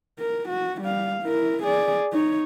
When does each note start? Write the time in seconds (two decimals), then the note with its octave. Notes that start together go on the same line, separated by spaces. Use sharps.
0.19 A#4
0.49 F#4
0.82 G3 F5
1.23 E4 A#4
1.63 G#4 D5
2.13 D#4 C#5